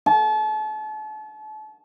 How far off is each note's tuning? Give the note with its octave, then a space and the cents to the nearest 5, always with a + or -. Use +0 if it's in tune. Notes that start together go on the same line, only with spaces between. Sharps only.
A5 -35